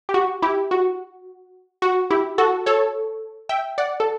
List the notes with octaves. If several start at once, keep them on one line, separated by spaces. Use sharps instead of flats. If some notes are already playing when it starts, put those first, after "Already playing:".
G4
F#4
E4 G4
F#4
F#4
E4 G4
F#4 A4
A4 C#5
E5 G5
D5 F#5
A4